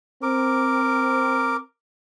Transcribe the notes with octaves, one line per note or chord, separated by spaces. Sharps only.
C4 A#4 D6